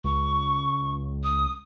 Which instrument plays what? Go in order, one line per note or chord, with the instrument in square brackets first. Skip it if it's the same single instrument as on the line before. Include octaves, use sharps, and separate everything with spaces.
[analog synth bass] C#2 [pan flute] C#6
[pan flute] D#6